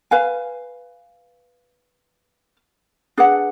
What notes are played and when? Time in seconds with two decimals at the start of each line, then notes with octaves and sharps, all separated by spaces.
0.11 B4 F5 G#5
3.17 D4 G#4 B4 F#5